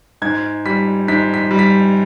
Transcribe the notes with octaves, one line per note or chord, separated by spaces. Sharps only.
G#2 G#6
G3 B6
G#2 B6
B6
G3
B6